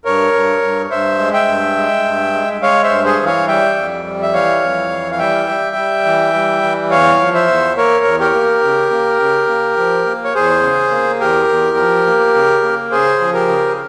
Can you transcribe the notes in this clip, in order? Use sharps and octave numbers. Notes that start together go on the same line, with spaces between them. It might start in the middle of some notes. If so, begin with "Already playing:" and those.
G2 A#4 C#5
G2
G2
G2 C5 E5
G#3
E5 G5
G2
G#3
G2
G#3
G#3 C#5 F5
C5 E5
G2
G#4 C5
E3
C#5 F5
G3 E5 G5
F2
G3
E5
E3 C#5 F5
F2
E3
F5
G3 E5 G5
G3
G3
E3
G3
E3
E2 C#5 F5
F3
C5 E5
E2
A#3 A#4 C#5
E2
G4 A#4
A#3
C#3
A#3
C#3
A#3
F3
A#3
C#5
E2 G#4 C5
C#3
A#3
E2 G4 A#4
E2
F3
A#3
C#3
A#3
C#3 G#4 C5
F3
G4 A#4
C#3